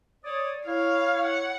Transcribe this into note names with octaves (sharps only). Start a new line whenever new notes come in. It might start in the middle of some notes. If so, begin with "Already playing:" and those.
C#5 D5 D#6
E4 C#5 F5
F#5